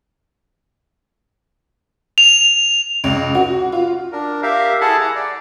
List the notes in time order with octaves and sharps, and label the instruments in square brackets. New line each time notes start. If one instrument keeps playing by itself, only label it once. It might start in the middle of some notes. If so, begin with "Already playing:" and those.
[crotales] F7
[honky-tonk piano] C#2
F#4
F4
[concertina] D4 A#4
G4 A#4 E5 F5
E4 G#4 A4 F#5 A5
A#5
D5